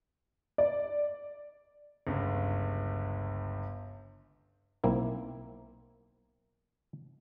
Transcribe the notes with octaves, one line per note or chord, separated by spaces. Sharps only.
D5
G1 C#2
B1 A#3 C4 E4